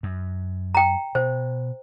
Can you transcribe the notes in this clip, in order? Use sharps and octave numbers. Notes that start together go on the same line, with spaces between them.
F#2
G5 A#5
B2 C5